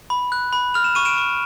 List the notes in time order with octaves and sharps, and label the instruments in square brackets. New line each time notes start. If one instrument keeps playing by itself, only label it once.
[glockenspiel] B5
F#6
B5
F6 F7
E7
C#6 D#7
D7 E7
C#6